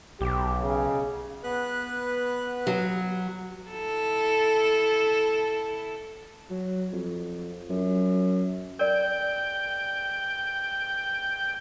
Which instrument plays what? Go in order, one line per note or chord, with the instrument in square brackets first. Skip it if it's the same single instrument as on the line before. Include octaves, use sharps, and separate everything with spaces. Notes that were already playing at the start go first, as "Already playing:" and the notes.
[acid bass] B1 [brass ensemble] G4
[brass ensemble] C#3
[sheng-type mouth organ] B3 B4 F#6
[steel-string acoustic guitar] F#3
[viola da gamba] E4 A4
[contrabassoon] F#3
F2
F#2
[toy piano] A#4 D5 [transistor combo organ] G5